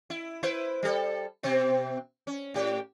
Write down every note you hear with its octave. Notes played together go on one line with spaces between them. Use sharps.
E4
E4 B4 C5
G3 A4
B2 C4
C#4
A2 G4